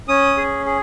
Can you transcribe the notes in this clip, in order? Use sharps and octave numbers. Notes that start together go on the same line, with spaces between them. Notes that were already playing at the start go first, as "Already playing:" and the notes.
C#4 D#6
G#4
G#4